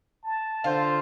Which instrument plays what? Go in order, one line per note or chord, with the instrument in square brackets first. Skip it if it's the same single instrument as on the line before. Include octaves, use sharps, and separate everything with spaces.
[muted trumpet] A5
[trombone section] D3 C5 [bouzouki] F4